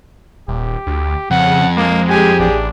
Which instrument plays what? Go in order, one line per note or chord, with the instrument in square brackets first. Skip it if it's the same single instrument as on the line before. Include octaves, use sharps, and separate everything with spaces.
[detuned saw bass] D#1 [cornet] G4
[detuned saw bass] D2
[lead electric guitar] F2 [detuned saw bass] C#3 [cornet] F#5
[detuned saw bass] G#3 [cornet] A#3
[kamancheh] G4 G#4 [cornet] G#5
[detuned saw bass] A1 [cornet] D4